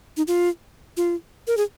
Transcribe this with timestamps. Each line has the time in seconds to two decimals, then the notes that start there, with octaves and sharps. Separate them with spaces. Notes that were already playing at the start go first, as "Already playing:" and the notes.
0.17 D#4
0.27 F4
0.97 F4
1.47 A#4
1.57 G#4